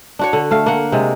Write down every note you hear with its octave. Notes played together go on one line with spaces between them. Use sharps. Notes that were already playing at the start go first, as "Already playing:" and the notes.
D4 F#4 C#5
D3
A3 F5
A#3 F#5
C3 G#3